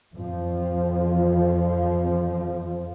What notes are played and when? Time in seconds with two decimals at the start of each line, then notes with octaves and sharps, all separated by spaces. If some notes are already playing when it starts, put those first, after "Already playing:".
0.15 F2 F3